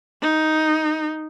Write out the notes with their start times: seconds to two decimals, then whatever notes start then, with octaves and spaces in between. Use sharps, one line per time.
0.22 D#4